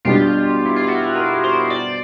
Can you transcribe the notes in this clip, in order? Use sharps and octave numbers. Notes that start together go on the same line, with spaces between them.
B2 G3 B3 D4 F4 G4
E4
F4
E4 F#4
G#4 A#4
A#4 C5
C5 D5